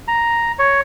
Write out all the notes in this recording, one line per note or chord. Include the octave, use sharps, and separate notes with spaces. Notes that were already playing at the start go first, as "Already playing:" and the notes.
A#5
C#5